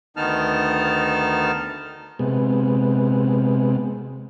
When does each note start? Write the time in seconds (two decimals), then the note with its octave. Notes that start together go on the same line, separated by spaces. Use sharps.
0.17 D2 D#3 B3 D#4 A5 F6
2.19 C3 G#3 B3